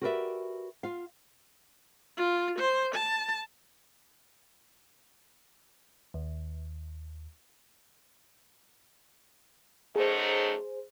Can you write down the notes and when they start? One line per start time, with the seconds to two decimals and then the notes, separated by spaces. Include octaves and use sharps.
0.01 F#4 G4 A#4 B4 D5 E5
0.83 F4 F5
2.17 F4
2.58 C5
2.95 A5
6.14 D#2
9.96 F#2 A3 D#4 G#4 C5